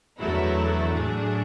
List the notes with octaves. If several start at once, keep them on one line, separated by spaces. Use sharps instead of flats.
E2 D3 F#3 A3 E4
A2 F#3 A3 D4 G#4